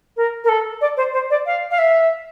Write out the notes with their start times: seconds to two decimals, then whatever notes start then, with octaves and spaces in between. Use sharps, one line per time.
0.16 A#4
0.44 A#4
0.48 A4
0.81 D5
0.96 C5
1.13 C5
1.30 D5
1.46 F5
1.70 F5
1.78 E5